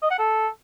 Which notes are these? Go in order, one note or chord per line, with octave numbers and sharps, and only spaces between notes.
D#5
F#5
A4